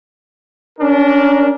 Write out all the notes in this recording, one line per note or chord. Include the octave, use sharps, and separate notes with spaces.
C#4 D4 A#4